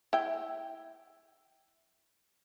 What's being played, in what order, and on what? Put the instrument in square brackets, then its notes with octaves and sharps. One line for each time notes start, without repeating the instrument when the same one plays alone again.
[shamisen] E4 G5